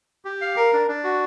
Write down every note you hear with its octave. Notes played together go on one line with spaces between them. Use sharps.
G4
F5
A#4
D4
D4
F#4